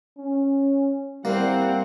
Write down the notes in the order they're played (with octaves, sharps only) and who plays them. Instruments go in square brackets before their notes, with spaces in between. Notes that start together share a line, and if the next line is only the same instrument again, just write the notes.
[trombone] C#4
[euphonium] G3 [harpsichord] A#3 [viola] C4 F#5 [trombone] E4